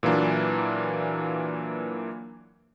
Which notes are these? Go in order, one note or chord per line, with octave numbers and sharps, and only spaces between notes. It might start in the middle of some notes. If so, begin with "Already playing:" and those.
A#2 E3 F#3 A#3 D4